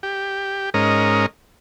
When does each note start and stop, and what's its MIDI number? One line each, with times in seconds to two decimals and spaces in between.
0.03 0.70 67
0.74 1.26 44
0.74 1.26 61
0.74 1.26 70
0.74 1.26 75